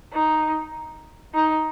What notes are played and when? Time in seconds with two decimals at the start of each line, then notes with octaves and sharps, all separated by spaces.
0.13 D#4
1.34 D#4